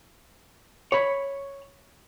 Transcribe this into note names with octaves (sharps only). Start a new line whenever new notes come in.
C#5 B5